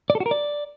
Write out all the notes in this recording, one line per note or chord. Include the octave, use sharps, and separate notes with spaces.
D5
A4
F#4
A#4
D5